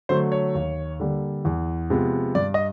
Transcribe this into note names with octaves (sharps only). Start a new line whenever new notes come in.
D3 F#3 A3 C5
C#5
D#2
D3 G3 A#3
E2
C3 F3 G#3 B3
G2 D5
D#5